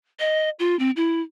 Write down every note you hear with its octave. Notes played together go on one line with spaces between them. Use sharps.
D#5
F4
C4
E4